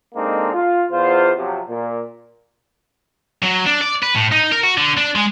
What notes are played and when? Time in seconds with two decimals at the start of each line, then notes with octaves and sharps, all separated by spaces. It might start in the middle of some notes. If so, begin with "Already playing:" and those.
0.15 G#3 A#3 C4 D4 D#4 A4
0.53 F4
0.90 E2 F4 C5
1.37 C3 F3 F#3
1.68 A#2
3.43 F#3
3.66 D4
3.81 D5
4.02 B4
4.15 A2
4.32 D#4
4.52 A#4
4.63 F#4
4.77 D3
4.97 D4
5.15 G#3